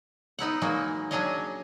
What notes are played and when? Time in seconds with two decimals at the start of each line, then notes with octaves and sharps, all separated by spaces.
0.39 B3 D#4 E4 F#5
0.61 E3 F#3 G#3 A#3 D#4 F#4
1.11 F#3 C#4 D4 G#4 C#5 D#5